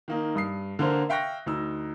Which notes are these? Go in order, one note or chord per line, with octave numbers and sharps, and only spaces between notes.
D#3 A#3 D#4
G2 D#6 C7
D3 A#3 A#4 C5
E5 F5 G5 C#6 F#6 A#6
D2 D#4 E6